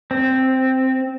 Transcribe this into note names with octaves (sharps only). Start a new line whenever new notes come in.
C4